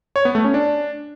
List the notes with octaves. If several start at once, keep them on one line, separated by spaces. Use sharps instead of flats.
C#5
B3
A3
C#4
D4